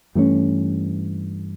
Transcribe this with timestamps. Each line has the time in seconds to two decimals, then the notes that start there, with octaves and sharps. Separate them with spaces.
0.15 G2 E3 A3 C#4